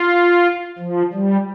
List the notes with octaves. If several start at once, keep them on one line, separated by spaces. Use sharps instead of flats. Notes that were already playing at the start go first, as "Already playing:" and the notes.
Already playing: F4
F3
G3